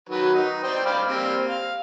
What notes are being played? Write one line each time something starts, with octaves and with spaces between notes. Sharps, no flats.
D#3 F#3 B4
D#4
C5 D5 G5
D5 F5 B5
G3 A#3 C4
F5